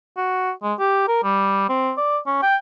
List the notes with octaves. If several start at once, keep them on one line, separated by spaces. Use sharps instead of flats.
F#4
G#3
G4
A#4
G3
C4
D5
C#4
G5